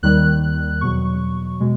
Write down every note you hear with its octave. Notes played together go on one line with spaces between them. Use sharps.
D#2 D#3 G3 F#6
E2 B2 F#3 C#6
B2 G#3